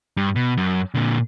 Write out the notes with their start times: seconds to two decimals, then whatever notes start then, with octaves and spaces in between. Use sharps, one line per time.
0.17 G2
0.36 B2
0.57 F#2
0.95 A#2 D3